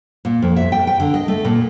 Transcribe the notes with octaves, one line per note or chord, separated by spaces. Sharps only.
A#2
F2
E5
G5
G5
D3
D#5
A3
A#2